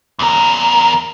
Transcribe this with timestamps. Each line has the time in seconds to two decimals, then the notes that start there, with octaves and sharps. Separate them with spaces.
0.19 E2 A#4